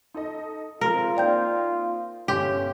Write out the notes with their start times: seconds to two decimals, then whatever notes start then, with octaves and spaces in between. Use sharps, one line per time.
0.14 D#4 A4 D#5
0.81 F3 G#3 C4 F4 A#4
1.17 A#3 C4 D#4 D5 G5 G6
2.28 G1 C#4 G4 F5 C6